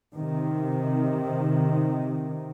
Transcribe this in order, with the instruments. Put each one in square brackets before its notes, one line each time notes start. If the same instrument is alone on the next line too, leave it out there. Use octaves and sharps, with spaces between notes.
[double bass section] C3 D#3